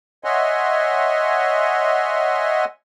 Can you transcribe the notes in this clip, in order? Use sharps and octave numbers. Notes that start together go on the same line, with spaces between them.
C#5 D#5 E5 F#5 G#5 C6